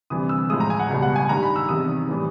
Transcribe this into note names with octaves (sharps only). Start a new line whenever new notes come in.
D2 C3 E3 G3 D#6
E6
A2 F3 G#3 D#6
A#5
G#5
F#5
C#2 B2 G3
F#5
G#5
G2 D#3 G3 A#5
B5
E6
E2 C3 D#3 D#6
A2 E3 G3